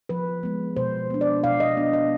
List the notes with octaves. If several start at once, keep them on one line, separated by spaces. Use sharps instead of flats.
F3 B4
G#3 B3
B2 C5
B3 D4
D5
B2 F5
D#5
B3 D4
D#5